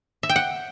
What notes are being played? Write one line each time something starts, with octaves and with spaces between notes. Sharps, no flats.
E5
G5
F#5